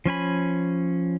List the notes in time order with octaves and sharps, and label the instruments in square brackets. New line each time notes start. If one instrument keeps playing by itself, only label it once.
[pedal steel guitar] F3 C#4 G#5 B5